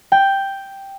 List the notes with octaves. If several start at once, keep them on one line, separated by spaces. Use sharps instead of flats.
G5